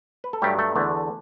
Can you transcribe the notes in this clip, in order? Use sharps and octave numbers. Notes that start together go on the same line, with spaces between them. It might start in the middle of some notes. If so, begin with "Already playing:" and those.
B4
A4
G2 F#3 G3 A3 G4
A3 A4
E2 D3 A3